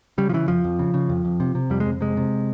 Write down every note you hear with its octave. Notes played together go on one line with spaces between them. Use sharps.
C#3 G3
F3
C#3 E3
F2 F3
F2
C#3
C#3
F2
F2
C3
C3
F2 G3
G#3
F2
C3 G#3
C3